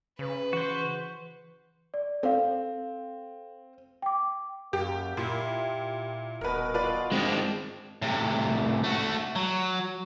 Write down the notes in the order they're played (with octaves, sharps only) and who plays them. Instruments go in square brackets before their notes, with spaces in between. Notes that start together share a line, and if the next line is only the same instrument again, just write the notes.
[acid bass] C#3 [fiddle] B4
[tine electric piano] E3 [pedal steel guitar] F#4 C5
[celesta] D5
[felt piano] C4 [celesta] A4 F5
[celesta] G5 D6
[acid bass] F#2 [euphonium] A#3 [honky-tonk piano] G4
[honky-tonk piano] A#2 [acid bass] E4 [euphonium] G4
[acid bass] D#1 [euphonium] B2 [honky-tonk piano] A#4 B4
[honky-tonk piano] F4 B4 D5
[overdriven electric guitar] G#3 C4 [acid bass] D4
[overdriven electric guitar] A2 C3
A3 F#4
F#3